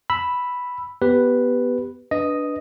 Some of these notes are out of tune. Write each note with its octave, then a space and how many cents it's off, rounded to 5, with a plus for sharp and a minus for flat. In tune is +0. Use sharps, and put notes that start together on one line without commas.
B5 +0 E6 +0
B3 +0 G4 +0 B4 +0
D4 -5 B4 +0 D#5 +0